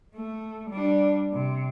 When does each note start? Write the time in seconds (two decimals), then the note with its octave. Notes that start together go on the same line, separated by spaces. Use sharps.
0.15 A3
0.71 G3 D4
1.33 C3